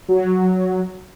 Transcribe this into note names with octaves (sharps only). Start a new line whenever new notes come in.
F#3